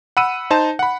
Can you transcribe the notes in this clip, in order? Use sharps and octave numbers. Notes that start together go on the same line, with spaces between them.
F#5 B5 E6 D#7
D#4 C5 A5
F#5 B5